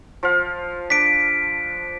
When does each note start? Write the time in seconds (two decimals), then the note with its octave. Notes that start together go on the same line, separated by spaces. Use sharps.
0.23 F3 F5
0.90 D4 B6 D7